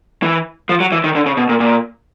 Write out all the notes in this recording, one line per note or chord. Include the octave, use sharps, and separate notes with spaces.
E3
F3
F#3
E3
D#3
D3
C#3
B2
A#2
A#2